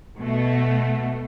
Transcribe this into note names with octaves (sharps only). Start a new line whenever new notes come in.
B2 A3